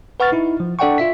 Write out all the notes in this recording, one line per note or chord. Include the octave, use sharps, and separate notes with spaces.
B4 F#5 C#6 F6 A6
D#4 E4
F3
D4 A4 D5 F#5 G5 C#6
F4 E5 B6